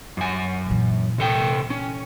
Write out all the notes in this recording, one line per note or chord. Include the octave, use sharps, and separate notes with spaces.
F#2 G#5
A#2 E3
C3 A4 G5
C#4